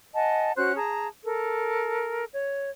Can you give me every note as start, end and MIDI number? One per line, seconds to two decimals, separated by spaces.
0.14 0.51 75
0.14 0.51 78
0.14 0.51 80
0.14 0.51 81
0.56 0.75 61
0.56 0.75 66
0.56 0.75 72
0.56 0.75 90
0.76 1.07 68
0.76 1.07 81
0.76 1.07 82
1.23 2.24 69
1.23 2.24 70
2.32 2.70 73